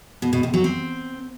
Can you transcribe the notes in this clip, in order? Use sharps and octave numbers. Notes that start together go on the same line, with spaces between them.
B2
B2
C3
F#3
C4